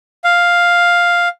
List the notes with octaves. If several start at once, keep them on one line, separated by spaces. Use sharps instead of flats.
F5